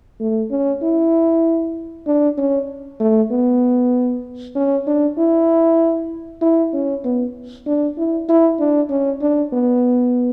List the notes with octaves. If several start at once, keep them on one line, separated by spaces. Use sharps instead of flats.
A3
C#4
E4
D4
C#4
A3
B3
C#4
D4
E4
E4
C#4
B3
D4
E4
E4
D4
C#4
D4
B3